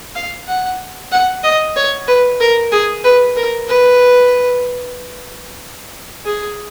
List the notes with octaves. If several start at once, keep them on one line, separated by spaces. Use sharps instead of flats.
F5
F#5
F#5
D#5
C#5
B4
A#4
G#4
B4
A#4
B4
G#4